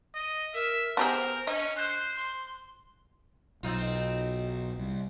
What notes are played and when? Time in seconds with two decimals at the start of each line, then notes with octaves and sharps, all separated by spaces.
0.14 D#5
0.54 A#4 E5
0.97 B3 G4 G#4 A#4 C5
1.47 C#4 D4 D#5
1.76 C5 F#6
2.16 C6
3.63 B1 C4 D#4 F4
4.78 C2